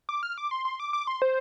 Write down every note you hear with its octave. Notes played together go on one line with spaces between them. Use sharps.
D6
F6
D6
C6
C6
D6
D6
C6
C5